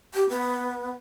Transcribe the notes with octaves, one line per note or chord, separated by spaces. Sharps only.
G4
B3